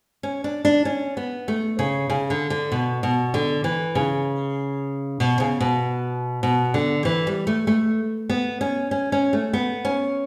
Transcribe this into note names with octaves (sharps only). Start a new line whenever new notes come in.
C#4
D4
D4
C#4
B3
A3
C#3
C#3
D3
D3
B2
B2
D3
E3
C#3
B2
C#3
B2
B2
D3
E3
G3
A3
A3
B3
C#4
C#4
C#4
A3
B3
C#4